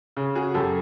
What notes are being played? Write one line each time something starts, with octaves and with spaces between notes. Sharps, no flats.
C#3
F#4 G#4
F#2 G4 A4